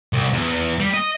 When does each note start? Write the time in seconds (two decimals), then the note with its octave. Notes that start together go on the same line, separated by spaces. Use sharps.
0.13 C2
0.33 E2
0.80 G3
0.94 D#5